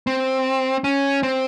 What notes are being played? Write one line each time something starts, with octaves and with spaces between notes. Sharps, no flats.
C4
C#4
C4